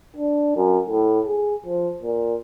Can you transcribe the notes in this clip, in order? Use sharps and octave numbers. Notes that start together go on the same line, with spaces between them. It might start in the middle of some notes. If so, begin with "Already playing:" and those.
D4
F#2
A2
G#4
F3
A#2